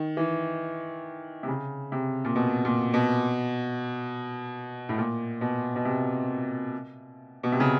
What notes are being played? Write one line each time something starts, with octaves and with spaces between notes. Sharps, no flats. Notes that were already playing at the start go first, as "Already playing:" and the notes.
Already playing: D#3
E3
C3
C#3
C3
A#2
B2
A#2
B2
A2
A#2
B2
B2
C3
B2
C3
C#3